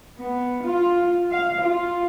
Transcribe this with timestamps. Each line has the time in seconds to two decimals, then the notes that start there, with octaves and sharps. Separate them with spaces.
0.19 B3
0.64 F4
1.31 F5
1.61 F4